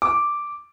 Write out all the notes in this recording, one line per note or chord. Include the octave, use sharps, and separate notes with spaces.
D6